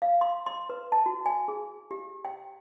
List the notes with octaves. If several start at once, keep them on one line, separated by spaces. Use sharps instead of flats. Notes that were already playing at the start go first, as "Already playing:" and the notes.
F5
C6
C6
B4
A5
F#4
G#5
G#4
G4
G5